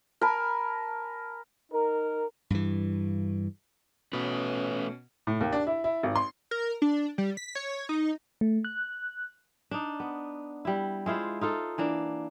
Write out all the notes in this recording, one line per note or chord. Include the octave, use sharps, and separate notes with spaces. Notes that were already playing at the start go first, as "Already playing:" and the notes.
A#4 G#5 A5 B5
D#4 A#4
G2 E3
B2 A3 C#4 B4
A2
D#2
D4
E4
E4
G#1
C6
A#4
D4
G3
B6
C#5
D#4
A3
F#6
D4 D#4
B3
G3 E4
G#3 E4 F4 C5
D#4 F4 A4
E3 A#3 D4